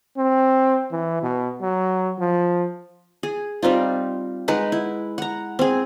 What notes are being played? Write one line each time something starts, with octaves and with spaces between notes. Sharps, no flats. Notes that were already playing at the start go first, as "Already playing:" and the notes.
C4
E3
B2
F#3
F3
G#4
G3 C4 D#4 F4
G#3 D#4 B4 F#5
E4
F#5 A#5
C4 G#4